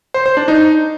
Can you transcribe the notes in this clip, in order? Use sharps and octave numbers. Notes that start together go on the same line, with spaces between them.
C5
C5
D4
D#4